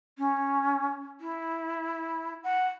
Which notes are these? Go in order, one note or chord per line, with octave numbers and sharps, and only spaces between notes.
C#4
E4
F#5